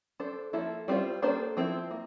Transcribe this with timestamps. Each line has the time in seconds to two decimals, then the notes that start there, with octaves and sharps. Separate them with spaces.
0.20 D4 A4 C5
0.53 F3 A#3 E4 A4
0.88 G3 C4 F4 C5
1.22 A#3 D4 A4 C5
1.57 F3 C4 E4
1.91 A#3